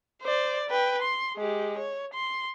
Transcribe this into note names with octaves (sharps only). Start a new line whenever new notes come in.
C5 D5
B4 G5
C6
G#3 G4
C#5
C6